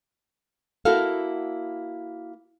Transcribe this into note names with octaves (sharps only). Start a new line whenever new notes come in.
A#3 E4 F#4 A4 F5